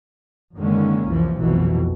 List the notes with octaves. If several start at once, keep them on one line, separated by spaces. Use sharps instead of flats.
F#2 D3 D#3 G#3 A#3 C#4
C2 F2 E3 F3
F1 B1 F2 B2 E3